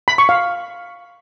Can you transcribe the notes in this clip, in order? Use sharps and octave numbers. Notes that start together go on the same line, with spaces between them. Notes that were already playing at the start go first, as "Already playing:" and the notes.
B5
C#6
F5